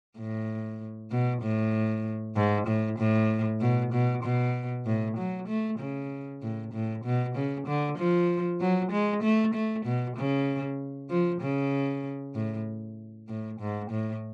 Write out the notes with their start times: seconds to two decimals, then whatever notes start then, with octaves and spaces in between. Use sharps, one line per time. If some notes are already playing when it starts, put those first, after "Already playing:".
0.18 A2
1.11 B2
1.42 A2
2.36 G#2
2.67 A2
2.99 A2
3.61 B2
3.93 B2
4.23 B2
4.86 A2
5.17 F#3
5.48 A3
5.79 C#3
6.42 A2
6.73 A2
7.04 B2
7.36 C#3
7.67 D3
7.98 F3
8.60 F#3
8.92 G#3
9.23 A3
9.54 A3
9.85 B2
10.16 C#3
11.10 F3
11.41 C#3
12.35 A2
13.29 A2
13.60 G#2
13.91 A2